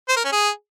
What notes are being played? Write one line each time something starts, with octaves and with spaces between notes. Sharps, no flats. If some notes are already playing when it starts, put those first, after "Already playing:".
C5
A#4
C#4
G#4